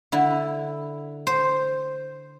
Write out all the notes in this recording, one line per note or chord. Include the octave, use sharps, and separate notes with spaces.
D3 E4
C5